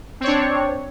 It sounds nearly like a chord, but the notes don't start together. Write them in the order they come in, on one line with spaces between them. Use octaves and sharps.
C4 C#5 D4